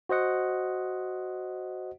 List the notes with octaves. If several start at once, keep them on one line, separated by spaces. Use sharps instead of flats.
F#4 C5 D#5 F#5